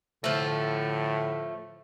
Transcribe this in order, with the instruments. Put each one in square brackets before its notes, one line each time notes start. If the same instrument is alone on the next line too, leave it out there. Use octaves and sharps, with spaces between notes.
[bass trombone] A2 [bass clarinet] D3 [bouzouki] F3 A3